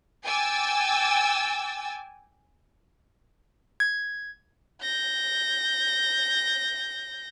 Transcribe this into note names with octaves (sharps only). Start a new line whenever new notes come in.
G5 G#5 D6 E6 A6
G#6
G6 A#6